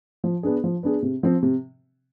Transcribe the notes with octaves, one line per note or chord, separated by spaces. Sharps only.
F3
B3 D4 G#4
F3
B3 D4 G#4
C3
F3 C4
C3